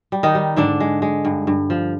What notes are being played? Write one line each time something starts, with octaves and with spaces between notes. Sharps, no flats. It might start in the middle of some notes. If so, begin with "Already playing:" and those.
G3
D#3 D#4
G3
G#2 D3 D4
G#3
G#3
G2
G2
F3